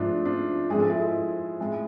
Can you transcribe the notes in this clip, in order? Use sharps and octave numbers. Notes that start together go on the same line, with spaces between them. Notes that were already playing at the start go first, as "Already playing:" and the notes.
Already playing: G#2 F3 A3 D4 F4
D4 F4
G#2 F3 G#3 G#4
A4
E4 G#4
A2 G#3